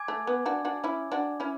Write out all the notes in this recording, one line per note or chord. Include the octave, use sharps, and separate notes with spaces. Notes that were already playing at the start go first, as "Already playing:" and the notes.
Already playing: G#5 D6 G#6
A3
B3
D4 F#4
D4 F#4
C#4 E4
D4 F#4
C#4 E4